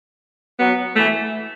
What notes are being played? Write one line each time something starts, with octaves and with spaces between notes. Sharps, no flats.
F#3 B3
E3 A3